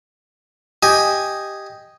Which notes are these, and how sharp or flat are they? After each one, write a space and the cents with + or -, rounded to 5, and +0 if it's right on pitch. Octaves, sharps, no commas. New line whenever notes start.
G4 +0 D#5 +0 G#5 +0